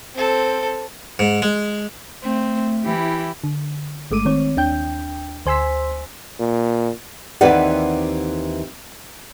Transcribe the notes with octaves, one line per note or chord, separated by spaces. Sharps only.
C4 A4
G#2
G#3
A3 C4
E3 E4 G4
D3
G1 G#3 A3 D6 D#7
D#3 C4 C#5
D#2 D4 G5 G6
D2 C5 G#5 C6 E6 B6
A#2
D#2 E3 C4 B4 D5 F#5